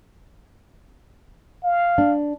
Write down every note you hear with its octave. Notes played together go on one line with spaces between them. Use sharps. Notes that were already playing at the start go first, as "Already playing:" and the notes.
F5
D4